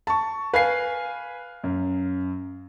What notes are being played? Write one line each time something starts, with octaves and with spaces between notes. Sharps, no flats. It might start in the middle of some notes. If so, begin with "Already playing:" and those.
A5 C#6
B4 F5 G#5 C7
F#2